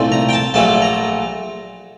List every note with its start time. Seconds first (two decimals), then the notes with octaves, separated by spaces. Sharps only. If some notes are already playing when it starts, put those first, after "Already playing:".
Already playing: C2 A#2 A3 D#4
0.12 A#5
0.29 G5
0.33 A5
0.54 A#1 A#2 F#3 A3 A5
0.82 A#5